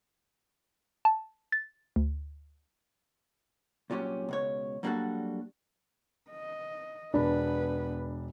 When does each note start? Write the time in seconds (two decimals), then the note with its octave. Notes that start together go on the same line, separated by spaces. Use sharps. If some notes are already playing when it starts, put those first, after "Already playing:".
1.05 A5
1.52 A6
1.96 D2
3.90 C2 A#2 F#3 C#4 G4
4.29 C#2 B2 C#5
4.83 F#3 G3 A#3 D4 F#4 A4
6.31 D#5
7.14 E1 B3 D4 B4 B5